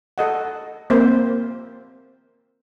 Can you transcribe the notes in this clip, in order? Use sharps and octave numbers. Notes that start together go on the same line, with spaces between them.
A4 D#5 F#5
A#3 C4 A#4 C5 E5